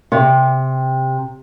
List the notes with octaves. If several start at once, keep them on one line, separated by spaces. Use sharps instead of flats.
C3